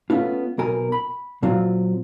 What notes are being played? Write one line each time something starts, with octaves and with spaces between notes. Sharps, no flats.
A3 B3 C#4 F4
B1 B2 A#4 G#5
B5
A#2 F#3 C4 F4